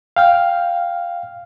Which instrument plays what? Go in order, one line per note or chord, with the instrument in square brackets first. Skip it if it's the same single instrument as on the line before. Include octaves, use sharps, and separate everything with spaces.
[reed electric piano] F5 G5 F6